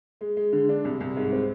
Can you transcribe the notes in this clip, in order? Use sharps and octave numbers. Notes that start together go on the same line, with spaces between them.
G#3
G#3
D3
D4
C2
C2
G#2
C4